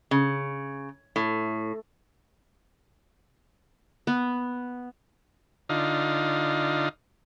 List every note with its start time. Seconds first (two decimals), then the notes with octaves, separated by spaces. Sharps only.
0.11 C#3
1.16 A2
4.07 B3
5.69 D3 D#4 F4